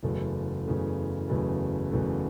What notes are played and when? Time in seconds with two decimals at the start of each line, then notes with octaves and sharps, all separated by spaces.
0.03 F#1 E2 C#3 F#3 A3
0.66 F#1 E2 C#3 F#3 A3
1.29 F#1 E2 C#3 F#3 A3
1.92 F#1 E2 C#3 F#3 A3